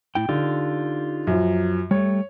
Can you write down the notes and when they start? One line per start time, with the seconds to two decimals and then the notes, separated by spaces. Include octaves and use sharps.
0.15 A2 E4 G5
0.29 D3 D#4 F4 G4
1.27 F#2 F3
1.91 G3 A3 C#5